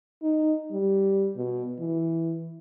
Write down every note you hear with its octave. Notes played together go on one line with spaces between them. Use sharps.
D#4
G3
B2
E3